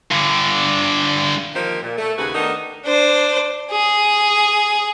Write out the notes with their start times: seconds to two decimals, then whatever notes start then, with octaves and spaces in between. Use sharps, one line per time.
0.11 G2 D3
1.55 D#3 F3 A#3 D#4 G4 C5
1.82 A#2
1.98 A3
2.17 D#2 C#3 F#4 G#4 B4
2.34 D#3 A3 B3 D4 D#4
2.85 D4 C5
3.71 G#4